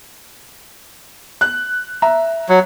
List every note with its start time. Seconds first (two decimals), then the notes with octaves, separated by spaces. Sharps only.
1.41 F#6
2.02 E5 A#5
2.49 F#3